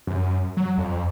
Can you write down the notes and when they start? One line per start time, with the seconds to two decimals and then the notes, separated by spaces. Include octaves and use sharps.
0.07 F#2
0.57 F#3
0.78 F2